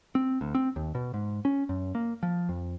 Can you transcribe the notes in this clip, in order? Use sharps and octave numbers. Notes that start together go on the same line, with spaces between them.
C4
D2
C4
D#2
B2
G#2
C#4
F#2
A#3
F3
F2